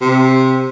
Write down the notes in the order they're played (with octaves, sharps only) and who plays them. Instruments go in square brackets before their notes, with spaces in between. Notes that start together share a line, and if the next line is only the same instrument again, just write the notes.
[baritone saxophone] C3